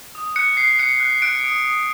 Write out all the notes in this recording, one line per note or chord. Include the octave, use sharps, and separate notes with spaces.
D#6
F#6 C#7
F#6 C7
F#6 C#7
F#6
F#6 D7
D#6
D#6